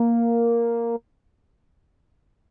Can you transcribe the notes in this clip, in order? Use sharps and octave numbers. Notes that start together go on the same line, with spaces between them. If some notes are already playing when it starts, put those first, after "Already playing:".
Already playing: A#3